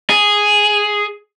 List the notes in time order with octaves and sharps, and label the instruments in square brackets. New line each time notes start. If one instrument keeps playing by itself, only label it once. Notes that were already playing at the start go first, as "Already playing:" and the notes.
[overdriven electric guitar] G#4